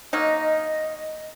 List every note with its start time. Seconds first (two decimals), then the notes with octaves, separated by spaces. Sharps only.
0.13 F#3 A#3 D#4 D#5